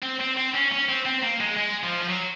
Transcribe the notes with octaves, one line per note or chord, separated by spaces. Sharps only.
C4
C4
C4
C#4
C#4
C4
C4
A#3
G#3
G#3
F3
F3
F#3